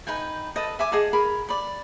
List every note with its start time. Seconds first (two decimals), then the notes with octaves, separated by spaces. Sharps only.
0.07 D#4 B4 G5 G#5
0.56 A4 B4 D#5
0.79 E5 G#5 D6
0.92 G#4 D#5 F#5 A5
1.13 G#4 A#4 B5
1.49 D5 B5